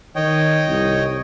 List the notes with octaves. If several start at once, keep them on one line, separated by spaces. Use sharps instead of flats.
D#3 C#5 D#5 G5
C2